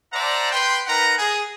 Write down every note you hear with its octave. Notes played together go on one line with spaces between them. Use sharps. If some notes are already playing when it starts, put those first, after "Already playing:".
C5 D5 E5 F#5 A5 A#5
B4 G5 C6
D#4 A#4 B4 F#5 A#5
G#4